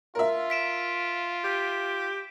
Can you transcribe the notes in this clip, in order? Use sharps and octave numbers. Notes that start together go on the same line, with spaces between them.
F4 A#4 E5
B6 D7 E7
G4